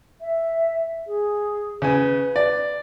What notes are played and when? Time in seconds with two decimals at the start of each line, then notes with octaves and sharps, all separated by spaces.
0.21 E5
1.07 G#4
1.82 C#3 B4 G#5
2.36 D5